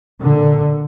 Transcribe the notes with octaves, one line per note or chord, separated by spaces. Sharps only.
A#2 D3